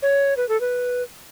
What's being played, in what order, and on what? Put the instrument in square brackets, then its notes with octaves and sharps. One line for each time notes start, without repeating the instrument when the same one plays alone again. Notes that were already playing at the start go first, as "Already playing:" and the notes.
[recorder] C#5
B4
A4
B4